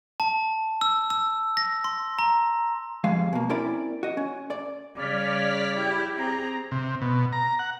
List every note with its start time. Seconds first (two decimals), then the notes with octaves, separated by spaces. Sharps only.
0.20 A5
0.81 E6
1.10 E6
1.57 A#6
1.84 C6
2.19 A#5
3.04 F2 G3 G#3 F5
3.33 B2 A#3
3.49 C4 C#4 E4 A#4 D5 B5
4.03 F#4 D#5
4.17 C#4
4.50 D5
4.96 C#3 G3 D5 F6 B6
5.76 E4 G4
6.17 C4 G#4 A#5
6.72 C3
7.02 B2
7.33 A#5
7.59 F#5